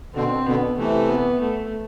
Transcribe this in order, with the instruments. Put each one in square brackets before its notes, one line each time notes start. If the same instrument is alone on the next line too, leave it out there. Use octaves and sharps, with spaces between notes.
[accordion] B2 D3 [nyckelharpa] C4
[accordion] B2 D3 [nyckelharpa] B3
[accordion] C3 E3 [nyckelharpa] A3
[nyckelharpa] B3
A3